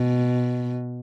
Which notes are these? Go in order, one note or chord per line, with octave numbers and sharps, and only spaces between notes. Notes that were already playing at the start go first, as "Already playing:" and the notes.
Already playing: B2